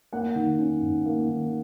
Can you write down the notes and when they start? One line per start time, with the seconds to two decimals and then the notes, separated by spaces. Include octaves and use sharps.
0.13 A#3 F#5
0.35 D#3
0.59 C#4
0.82 G#2
1.06 A#3
1.28 D#3